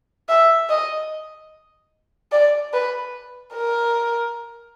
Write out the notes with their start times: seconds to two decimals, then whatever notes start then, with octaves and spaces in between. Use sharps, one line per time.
0.29 E5
0.70 D#5
2.32 D5
2.73 B4
3.55 A#4